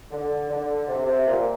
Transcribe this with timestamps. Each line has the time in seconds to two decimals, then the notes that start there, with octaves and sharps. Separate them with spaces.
0.11 D3
0.50 D3
0.88 C3
1.07 C3
1.26 A#2